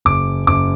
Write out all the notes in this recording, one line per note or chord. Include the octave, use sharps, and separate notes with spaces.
F#1 D6
F#1 D6